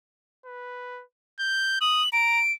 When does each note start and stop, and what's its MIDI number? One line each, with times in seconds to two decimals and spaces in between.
0.45 1.03 71
1.39 1.77 91
1.81 2.03 87
1.81 2.09 102
2.13 2.41 82
2.13 2.52 98